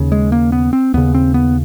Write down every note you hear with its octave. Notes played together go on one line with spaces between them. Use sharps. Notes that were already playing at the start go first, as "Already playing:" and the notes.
Already playing: D#2 C#3
G#3
A#3
B3
C4
D#2 C#3 B3
C4
B3